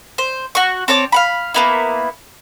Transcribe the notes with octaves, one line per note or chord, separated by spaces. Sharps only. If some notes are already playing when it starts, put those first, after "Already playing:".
C5
F#4 C#6
C4 C#5 A5 D6
F5 F#5 B5
A#3 B3 E4